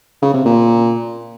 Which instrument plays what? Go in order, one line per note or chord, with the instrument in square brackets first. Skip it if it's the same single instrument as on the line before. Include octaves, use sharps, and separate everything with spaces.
[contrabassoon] C#3
C3
A#2